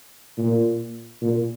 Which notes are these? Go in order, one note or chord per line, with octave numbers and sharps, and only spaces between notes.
A#2
A#2